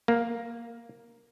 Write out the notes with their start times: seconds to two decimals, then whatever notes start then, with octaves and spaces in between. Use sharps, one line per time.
0.08 A#3